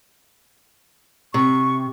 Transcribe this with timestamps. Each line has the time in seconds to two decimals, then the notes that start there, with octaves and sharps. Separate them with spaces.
1.34 C3 C#6